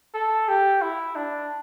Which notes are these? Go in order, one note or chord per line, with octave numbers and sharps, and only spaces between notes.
A4
G4
E4
D4